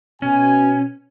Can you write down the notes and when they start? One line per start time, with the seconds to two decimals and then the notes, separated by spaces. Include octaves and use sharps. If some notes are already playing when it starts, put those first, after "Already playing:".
0.22 B2 C#4 G#5